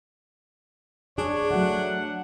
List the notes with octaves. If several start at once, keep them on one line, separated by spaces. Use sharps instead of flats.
D4 G#4 C#5
F#3 A3 F#5